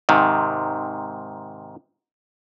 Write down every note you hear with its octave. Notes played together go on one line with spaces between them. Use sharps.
G#2 C3 D#3